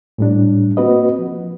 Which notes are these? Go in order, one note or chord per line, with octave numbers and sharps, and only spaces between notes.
A2 G3 D4
A#3 C4 F#4 B4 D#5
F3